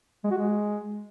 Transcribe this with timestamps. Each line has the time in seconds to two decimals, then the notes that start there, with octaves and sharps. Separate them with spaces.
0.24 G#3
0.31 F#4
0.38 G#3